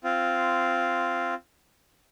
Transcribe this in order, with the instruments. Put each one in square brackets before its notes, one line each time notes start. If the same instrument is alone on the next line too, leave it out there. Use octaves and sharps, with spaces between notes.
[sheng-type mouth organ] C4 F4